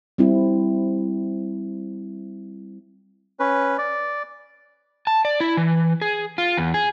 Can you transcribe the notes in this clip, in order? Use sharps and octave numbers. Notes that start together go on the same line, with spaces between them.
G3 C4 E4
C#4 B4
D5
A5
D5
E4
E3
G#4
F4
E2
G#4